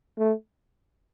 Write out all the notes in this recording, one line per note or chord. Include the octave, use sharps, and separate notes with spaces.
A3